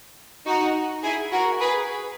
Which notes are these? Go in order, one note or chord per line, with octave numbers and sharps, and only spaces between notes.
D#4 F#4
E4 G#4
F#4 A#4
G#4 B4